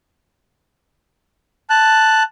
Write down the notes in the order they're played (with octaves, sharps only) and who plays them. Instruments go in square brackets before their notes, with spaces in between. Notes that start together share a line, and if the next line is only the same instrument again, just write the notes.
[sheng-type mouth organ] A5 F#6